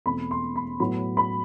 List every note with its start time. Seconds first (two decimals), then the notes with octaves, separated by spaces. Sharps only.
0.06 E2 B2 A3 C4 B5
0.31 C6
0.56 B5
0.80 A2 F#3 B3 B5
1.17 B5